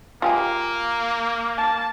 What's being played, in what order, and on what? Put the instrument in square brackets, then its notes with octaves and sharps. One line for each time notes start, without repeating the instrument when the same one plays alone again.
[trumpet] A#3 [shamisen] F4 G4 G#4
[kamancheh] A5